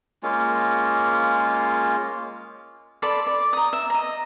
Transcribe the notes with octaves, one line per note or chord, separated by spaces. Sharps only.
G#3 A#3 C#4 F4
A4 D5 B5 C6
D5
A#5 D#6
E5
D#5 A#5